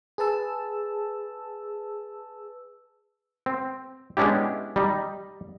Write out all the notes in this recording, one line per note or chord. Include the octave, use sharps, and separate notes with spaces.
G#4 B4 A5 E6
C4
G#3 B3 C#4 D4 E4 G4
G3 D#4